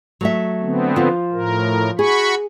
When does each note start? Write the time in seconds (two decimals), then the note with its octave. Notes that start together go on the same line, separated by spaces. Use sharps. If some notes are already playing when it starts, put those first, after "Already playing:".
0.21 F#3 A3 E5
0.62 D3 B3 C4
0.96 F3 F4
1.33 A2 A#4
1.99 F#4 G#4 B5 C#6